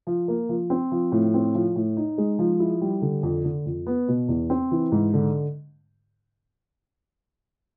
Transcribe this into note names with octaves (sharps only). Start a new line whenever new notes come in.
F3
A#3
F3
C4
F3
A2
C4
F3
A2
D#4
G#3
F3
E4
G3
D3
F2
D3
F2
B3
B2
E2
C4
E3
G#2
D3